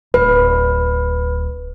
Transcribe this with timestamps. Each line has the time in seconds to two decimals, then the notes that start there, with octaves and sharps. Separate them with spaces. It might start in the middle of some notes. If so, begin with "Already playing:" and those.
0.14 D1 B4